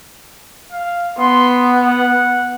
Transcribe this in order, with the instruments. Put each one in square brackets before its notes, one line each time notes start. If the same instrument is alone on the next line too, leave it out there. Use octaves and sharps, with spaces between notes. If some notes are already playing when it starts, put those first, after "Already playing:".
[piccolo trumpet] F5
[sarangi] B3 [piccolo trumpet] C6
[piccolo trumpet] F#5